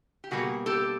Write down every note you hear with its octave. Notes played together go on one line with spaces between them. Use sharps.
G4
B2 G3 A#3 F#4 G#4
G4 A4